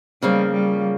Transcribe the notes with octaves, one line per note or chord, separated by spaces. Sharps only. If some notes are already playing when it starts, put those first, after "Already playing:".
C#3 F3 G3 A#3
G3